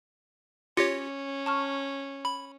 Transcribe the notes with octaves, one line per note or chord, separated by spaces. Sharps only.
C#4 F4 G4 C#5 D6 A#6 C#7
A5 C#6 F6
B5